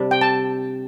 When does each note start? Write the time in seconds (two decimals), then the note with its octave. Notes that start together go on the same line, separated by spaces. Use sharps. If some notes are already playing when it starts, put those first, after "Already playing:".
Already playing: C3 G3 D4
0.11 G5
0.21 A5